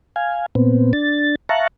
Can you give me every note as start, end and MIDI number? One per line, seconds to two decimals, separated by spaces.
0.16 0.46 77
0.16 0.46 80
0.55 0.93 46
0.55 0.93 59
0.55 0.93 60
0.93 1.35 62
0.93 1.35 93
1.49 1.67 76
1.49 1.67 77
1.49 1.67 81
1.49 1.67 82
1.49 1.67 85
1.49 1.67 90